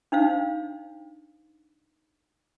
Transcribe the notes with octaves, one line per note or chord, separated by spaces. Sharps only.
D4 D#4 C5 F5